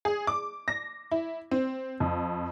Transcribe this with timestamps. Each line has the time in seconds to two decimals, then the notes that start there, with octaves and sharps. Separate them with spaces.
0.05 G#4
0.27 D6
0.68 A#6
1.11 E4
1.51 C4
2.00 F2